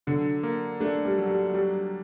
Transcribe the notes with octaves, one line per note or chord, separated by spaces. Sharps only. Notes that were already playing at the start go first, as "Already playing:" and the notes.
D3 F#3
A#3
A3 D4
G3
F#3
G3
F#3 G3